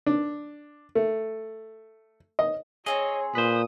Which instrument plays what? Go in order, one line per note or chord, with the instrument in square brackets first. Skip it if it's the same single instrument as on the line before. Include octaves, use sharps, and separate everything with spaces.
[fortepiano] D4
A3
D#5
[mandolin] C4 E4 G#4 [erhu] C#5 [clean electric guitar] D#5
[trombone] A#2 [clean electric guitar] B4 C5 [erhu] D#6